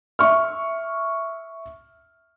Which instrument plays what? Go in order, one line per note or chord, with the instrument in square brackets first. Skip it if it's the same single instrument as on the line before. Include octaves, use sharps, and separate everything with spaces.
[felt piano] E5 C#6 F6